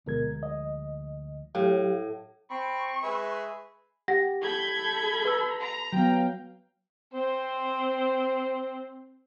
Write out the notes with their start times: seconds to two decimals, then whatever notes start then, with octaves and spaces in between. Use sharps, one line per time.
0.06 D2 B2 F3 G#3 A#4 G#6
0.43 D#5
1.55 A2 F#3 G4 F5
2.50 C4 B5 C#6
3.03 G#3 G#4 B4 E5
4.08 G4 F#5 A#6
4.41 A4 B5 G6 G#6
5.25 B4 E6
5.61 A#5
5.93 F#3 B3 F5 G5
7.14 C4 C5